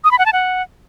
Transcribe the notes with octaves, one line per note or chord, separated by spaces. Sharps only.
D#6
B5
F#5
A5
F#5